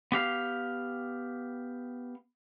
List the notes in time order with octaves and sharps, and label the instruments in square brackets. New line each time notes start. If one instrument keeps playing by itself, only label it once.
[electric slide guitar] B3 G4 F5